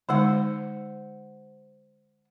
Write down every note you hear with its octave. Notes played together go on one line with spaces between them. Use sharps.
D3 G#3 D#4 C5 F#5